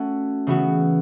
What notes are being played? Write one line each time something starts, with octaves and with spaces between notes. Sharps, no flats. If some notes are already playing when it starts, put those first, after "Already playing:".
Already playing: A3 C#4 F#4
C#3 E3 B3 F#4